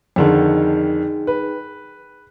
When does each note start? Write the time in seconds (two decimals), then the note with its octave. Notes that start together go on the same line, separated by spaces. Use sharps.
0.16 F2 D3 D#3 D#4 G#4 G5
1.27 B4